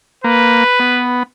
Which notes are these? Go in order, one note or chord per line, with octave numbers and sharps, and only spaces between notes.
A#3 B4
B3